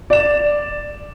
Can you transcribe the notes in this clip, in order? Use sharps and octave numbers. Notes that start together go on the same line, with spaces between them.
D5 E7